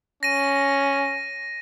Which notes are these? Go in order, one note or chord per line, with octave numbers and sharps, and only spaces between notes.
C#4 A#6 D#7